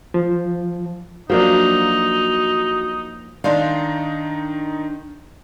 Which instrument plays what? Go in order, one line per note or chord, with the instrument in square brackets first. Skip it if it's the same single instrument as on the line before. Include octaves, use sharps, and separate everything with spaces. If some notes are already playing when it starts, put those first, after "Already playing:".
[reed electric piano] F3
[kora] F3 A#3 D4 [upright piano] F#3 [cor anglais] D#4
[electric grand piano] D#3 D#4 C6 [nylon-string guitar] D4 F5 [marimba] D5